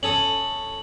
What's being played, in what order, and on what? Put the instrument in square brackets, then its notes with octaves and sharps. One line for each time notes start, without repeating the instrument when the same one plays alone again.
[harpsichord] C#4 A4 D#6 [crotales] F#7